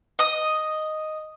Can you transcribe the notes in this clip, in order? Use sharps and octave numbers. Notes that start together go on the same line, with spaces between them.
D#5 D#6